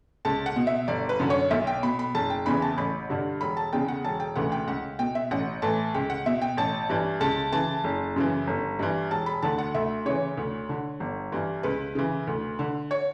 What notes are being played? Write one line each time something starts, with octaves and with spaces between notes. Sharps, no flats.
C#2 A5
F#5
B2
E5
G1 D5
B4
F#2 D3
C#5
B1 E5
G5
B2 B5
B5
F#1 A5
G5
E2 C#3 E3 B5
A5
A1 B5
G2 D3
E1 B5
A5
E2 C#3 G5
F#5
E1 A5
G5
D2 C#3 E3 F#5
G5
C#2 F#5
B2 G5
E5
A1 F#5
A2 E3 A5
C#2 G5
F#5
B2 E5
G5
A1 A5
G2 E3
C#2 A5
C#3 E3 A5
F#1
F#2 C#3 E3
G1
G2 E3
E1 A5
B5
D2 D3 A5
F#5
D2 E5
C#3 E3 C#5
D2
D3
G1
G2 E3
C#2 B4
C#3 E3
D2
D3
C#5